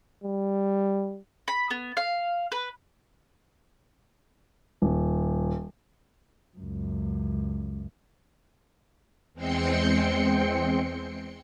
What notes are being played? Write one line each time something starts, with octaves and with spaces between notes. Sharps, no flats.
G3
B5
B3
F5
B4
D#1
C#2 F#2
E2 G#3 C4 G5 C6 C#7